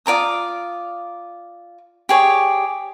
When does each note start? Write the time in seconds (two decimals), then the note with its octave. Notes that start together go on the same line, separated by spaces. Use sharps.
0.06 F4 D5 A#5 D#6
2.09 G4 G#4 C#5 D5